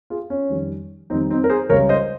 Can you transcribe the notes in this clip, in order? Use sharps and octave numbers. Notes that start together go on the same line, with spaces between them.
F4 G#4
C#4
F2 D#3 G3
F2 D#3 G3 C4 D#4
C4 D#4
A#4
G#4 C5
C#2 C#3 G3 A#4 C#5
C5 D#5